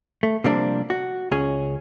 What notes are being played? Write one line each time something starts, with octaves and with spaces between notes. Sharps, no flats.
A3
C3 F3 G3 A#3 C4 D4
F#4
C#2 C#4 G#4